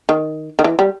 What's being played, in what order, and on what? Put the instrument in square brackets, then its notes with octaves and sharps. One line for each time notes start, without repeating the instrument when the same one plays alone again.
[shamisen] D#3
D#3
E3
G3